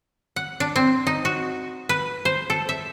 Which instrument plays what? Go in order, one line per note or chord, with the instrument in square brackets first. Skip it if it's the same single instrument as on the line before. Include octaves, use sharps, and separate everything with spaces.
[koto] F#5
D4
C4
D#4
F#4
B4
C5
A4
E5